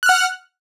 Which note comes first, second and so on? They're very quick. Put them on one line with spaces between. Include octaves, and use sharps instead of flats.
F#6 F6 F#5